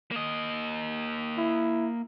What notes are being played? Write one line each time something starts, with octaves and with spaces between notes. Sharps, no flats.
A#3 D#5
E4